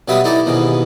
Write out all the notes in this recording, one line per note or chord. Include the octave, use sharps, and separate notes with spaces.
B2 F#3 G3 B3 E5 D#6
D#4 E4 A4 D5
D#2 G#2 B2 E3